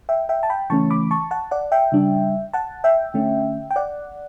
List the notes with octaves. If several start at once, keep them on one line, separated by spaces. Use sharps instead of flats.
E5 G5
E5 G5
A5
G5 B5
C#3 E3 A3 C#4 A5 C#6
B5 D6
A5 C#6
F#5 A5
D5 F#5
E5 G5
C#3 G3 D4
F#5 A5
E5 G5
D3 A3 C#4
G5
D5 F#5